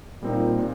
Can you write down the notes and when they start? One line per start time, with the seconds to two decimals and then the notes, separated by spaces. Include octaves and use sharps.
0.22 A#2 G3 C4 D#4
0.59 A#2